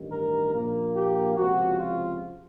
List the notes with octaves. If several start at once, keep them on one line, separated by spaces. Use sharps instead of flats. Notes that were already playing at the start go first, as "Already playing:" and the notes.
Already playing: A1 G2 D#3
A#4
A#1 A#2 F3 A#3
G4
C#2 C3 F3 F#4
F4